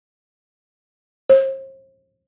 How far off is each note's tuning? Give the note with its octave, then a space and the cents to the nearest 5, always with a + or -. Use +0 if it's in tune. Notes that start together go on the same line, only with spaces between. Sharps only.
C5 +40